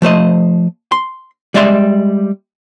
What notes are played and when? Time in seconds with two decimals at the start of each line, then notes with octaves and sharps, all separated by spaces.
0.02 F3 A3 C5 D#5
0.92 C6
1.54 G3 G#3 D5 E5 G5 C6